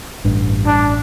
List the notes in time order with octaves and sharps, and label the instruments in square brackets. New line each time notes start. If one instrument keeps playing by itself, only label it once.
[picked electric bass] A1 [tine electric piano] G2
[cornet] D4